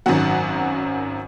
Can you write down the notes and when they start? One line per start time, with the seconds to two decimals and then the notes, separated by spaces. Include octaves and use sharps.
0.06 G#1 F#2 D#3 F#3 F#5